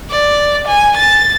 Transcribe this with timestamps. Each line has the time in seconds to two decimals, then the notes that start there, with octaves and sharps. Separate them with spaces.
0.10 D5
0.67 G#5
0.97 A6